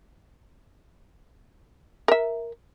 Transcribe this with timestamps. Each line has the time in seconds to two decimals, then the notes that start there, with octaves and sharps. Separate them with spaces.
2.08 A#4 E5